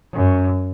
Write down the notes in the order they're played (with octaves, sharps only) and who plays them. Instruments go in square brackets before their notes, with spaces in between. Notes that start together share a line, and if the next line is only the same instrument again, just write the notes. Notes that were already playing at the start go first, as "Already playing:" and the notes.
[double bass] F#2